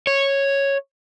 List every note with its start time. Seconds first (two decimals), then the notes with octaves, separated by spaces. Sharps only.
0.07 C#5